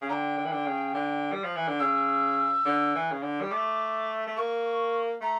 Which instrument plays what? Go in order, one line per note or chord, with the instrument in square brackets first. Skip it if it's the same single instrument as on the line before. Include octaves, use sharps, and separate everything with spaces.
[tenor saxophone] C#3
[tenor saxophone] D3 [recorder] G5 A#5
[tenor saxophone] D3
E3
D3
C#3
D3
G3
F3
E3
D3
[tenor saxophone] C#3 [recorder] E6
[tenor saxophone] D3
E3
C#3
D3
G3
[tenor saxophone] A3 [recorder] D6
[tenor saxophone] A3
[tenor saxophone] A#3 [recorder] C#6
[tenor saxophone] A3 [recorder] A#5